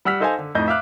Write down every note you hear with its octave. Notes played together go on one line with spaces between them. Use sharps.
G3 F#5 E6 F6 B6
D#4 A4 C5 D#5 F5 G#5
D3
F2 A2 D#4 D#5 G6
E5 F5 D6 F6 F#6